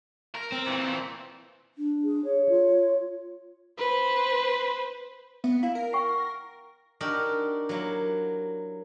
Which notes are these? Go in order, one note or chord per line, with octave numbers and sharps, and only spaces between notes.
A#4
C4
A#2 E3
D4
G#4
C#5
F4
B4 C5
B3 E5
E4 F5
A#4
F#5 G5 C#6
D4 D#4 F#4 G4 A#4
F#3 A#3 E4